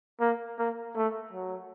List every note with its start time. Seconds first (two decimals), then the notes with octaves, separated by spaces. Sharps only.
0.20 A#3
0.59 A#3
0.96 A3
1.33 F#3